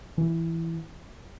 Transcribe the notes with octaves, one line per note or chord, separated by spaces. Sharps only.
E3